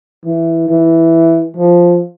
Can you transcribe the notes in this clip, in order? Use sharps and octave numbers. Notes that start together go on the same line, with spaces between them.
E3
E3
F3